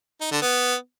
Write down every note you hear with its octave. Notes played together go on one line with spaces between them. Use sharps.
D#4
D3
B3